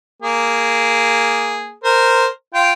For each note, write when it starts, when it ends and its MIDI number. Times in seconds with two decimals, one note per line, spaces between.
0.23 1.72 58
0.23 1.72 68
1.84 2.26 70
1.84 2.26 72
2.54 2.72 65
2.54 2.72 79